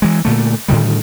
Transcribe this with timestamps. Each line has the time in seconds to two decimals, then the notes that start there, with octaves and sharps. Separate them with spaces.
0.02 E3 G#3
0.25 A#2 D3 A3
0.68 A2 D3 D#3 G3